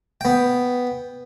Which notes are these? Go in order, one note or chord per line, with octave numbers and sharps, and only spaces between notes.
B3 G5